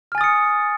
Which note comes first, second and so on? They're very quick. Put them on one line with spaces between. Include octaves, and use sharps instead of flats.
F6 G#5 A6 D#6 C#7